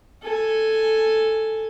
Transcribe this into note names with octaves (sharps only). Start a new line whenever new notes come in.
A4 G#5